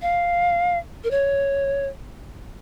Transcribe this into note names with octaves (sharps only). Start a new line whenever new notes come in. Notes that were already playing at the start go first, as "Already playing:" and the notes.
F5
A#4
C#5